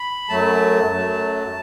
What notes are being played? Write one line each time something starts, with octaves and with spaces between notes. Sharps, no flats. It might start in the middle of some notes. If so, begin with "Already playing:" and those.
Already playing: B5
F#2 F#3 A3 A5
F#2 F#3 A3